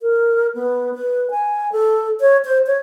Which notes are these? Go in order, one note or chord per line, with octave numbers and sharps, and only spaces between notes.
A#4
B3
B4
G#5
A4
C#5
C5
C#5